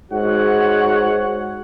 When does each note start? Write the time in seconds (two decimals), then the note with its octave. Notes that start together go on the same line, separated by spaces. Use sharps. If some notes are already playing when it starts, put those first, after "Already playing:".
0.11 G#2 F#4 C#5 F#5